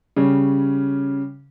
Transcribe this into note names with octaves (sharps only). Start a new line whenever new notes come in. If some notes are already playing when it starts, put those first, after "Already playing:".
C#3 G3 C#4